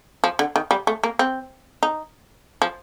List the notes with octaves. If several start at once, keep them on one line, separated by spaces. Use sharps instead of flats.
F3
D3
D#3
G3
A3
A#3
C4
D#4
F3